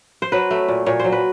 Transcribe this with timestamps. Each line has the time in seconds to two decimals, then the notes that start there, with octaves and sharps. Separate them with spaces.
0.22 C5
0.32 F#3 B4
0.51 A3
0.68 A#2
0.86 A#2 C#5
0.99 F#3 C5
1.12 B4